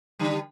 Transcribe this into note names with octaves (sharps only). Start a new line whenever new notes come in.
D3 G3